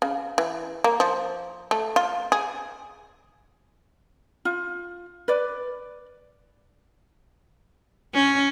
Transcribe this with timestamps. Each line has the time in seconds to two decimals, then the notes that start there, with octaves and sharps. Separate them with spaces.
0.02 C#3
0.38 E3
0.84 A#3
1.00 F3
1.71 A3
1.96 F4
2.32 G#4
4.45 F4
5.28 B4 D5
8.14 C#4